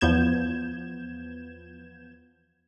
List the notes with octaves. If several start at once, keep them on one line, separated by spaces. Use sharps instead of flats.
E2 F3 B3 G6 G#6 E7